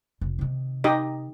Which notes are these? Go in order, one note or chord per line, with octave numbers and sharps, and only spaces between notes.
F1
C3 D#3
D#4 G4 D#5